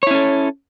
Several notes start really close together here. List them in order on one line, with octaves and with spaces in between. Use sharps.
C#5 E4 C#4 A4